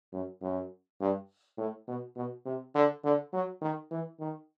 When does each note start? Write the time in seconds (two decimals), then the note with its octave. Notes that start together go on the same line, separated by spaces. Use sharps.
0.13 F#2
0.41 F#2
1.00 G2
1.57 A2
1.88 B2
2.16 B2
2.46 C3
2.75 D3
3.04 D3
3.33 F#3
3.62 D#3
3.91 E3
4.20 D#3